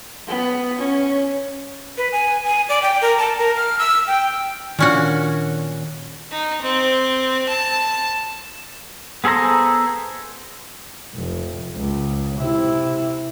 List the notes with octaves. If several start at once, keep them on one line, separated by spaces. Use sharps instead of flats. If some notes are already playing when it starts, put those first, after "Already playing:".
B3
C#4
B4
G#5
G#5
D5
G5
A#4
A5
A#4
F6
E6
G5
A#2 D#3 C#4 D4 F#4
D#4
C4
A5
B3 G#4 A4 C5 A#5
F1
C#2
C3 E4